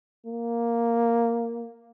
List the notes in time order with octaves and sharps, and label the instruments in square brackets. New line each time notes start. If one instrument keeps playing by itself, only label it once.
[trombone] A#3